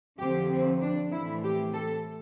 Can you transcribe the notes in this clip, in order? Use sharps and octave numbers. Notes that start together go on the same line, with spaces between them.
F2 D3 F3 C4 G4
C4
D4
A2 E3 A3 C4 E4
G4
A4